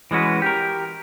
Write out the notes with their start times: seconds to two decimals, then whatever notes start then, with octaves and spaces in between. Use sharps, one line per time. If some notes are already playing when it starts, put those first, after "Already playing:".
0.11 E3 G#3 C#4 F#4 B4
0.42 G4 A#4